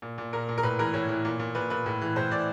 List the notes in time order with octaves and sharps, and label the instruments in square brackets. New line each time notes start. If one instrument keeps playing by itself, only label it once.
[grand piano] A#2
A#2
A#2 A#4
A#2
A#4
A2 B4
E3 A#4
A2 C#5
E3
A#2
A#2
A#2 B4
A#2 B4
A2
E3
A2 C5
E3 D5